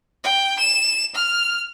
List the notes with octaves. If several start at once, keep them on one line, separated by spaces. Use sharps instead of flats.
G5
E7
F6